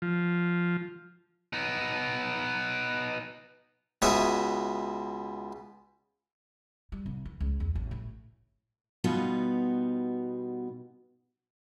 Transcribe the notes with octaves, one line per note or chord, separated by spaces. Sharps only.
F3
B3 D#4
C#2 B2 C#5 E5 D#6
G3
C2
E3
C#2
E2
A1
A2
B2 G3 B3 D#4 F4 F#4